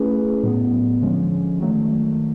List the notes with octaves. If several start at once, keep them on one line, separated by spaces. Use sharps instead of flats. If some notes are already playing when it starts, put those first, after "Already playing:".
Already playing: A3 C#4 E4 G#4 B4
A2 F#3 B3
D3 F3 G#3 C#4
D#3 F#3 A3